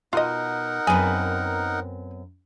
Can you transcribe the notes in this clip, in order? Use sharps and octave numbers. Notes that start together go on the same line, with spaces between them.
B2 D#4 F4 A#4 D#5 F#5
F#2 B3 C4 G#4 B4